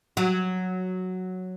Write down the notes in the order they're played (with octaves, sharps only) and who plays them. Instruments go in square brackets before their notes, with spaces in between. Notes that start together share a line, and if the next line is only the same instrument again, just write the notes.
[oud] F#3